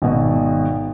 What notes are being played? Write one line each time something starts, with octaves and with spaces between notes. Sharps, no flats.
G#1 B2